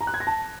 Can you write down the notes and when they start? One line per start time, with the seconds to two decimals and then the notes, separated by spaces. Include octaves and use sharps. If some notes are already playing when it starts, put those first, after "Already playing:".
0.01 A#5
0.07 F#6
0.14 G#6
0.20 A#6
0.27 A5